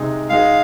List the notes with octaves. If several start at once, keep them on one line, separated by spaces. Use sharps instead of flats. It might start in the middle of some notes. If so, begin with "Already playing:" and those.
Already playing: C3 G#3 D#4 G#4
G#3 D#4 G#4 F5